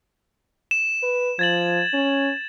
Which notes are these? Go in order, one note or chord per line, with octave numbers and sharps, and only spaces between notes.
E7
B4
F3 G#6 A6 F#7
C#4